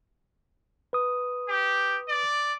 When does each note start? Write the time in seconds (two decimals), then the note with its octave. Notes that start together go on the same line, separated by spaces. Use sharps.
0.93 B4 D#6
1.49 G4
2.09 D5